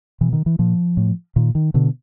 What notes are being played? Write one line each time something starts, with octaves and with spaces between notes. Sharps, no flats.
B2 E3
D#3
E3
A#2 F3
A2
A#2 D#3
D#3
B2 D3